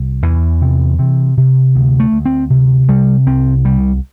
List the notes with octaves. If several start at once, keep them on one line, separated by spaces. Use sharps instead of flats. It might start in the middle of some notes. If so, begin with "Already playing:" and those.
Already playing: C2
E2 E3
C3
C3
C3
D2
A3
D2
C4
C3
C3 G3
C2 C4
C2 G3